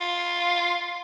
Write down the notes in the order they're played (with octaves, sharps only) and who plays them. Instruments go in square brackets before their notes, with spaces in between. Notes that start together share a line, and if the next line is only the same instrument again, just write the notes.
[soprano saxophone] F4